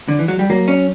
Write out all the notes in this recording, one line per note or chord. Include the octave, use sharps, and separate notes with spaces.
D3
E3
F#3
G3
F#3 A#3
C#4